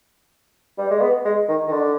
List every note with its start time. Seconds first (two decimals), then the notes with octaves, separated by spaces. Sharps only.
0.78 G3
0.91 G#3
1.01 B3
1.25 G#3
1.48 D#3
1.67 D#3
1.72 D3